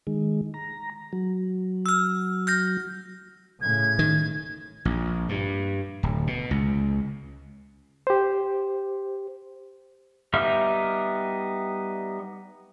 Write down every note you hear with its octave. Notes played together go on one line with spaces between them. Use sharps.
D#3 G#3
A#5
F#3
E6 F6
F6 G6 A#6
A2 C#3 G#6
D#3
A#1
G2
D1
B2
C#2
G4 C5
G3 B3 D#4 E5 F6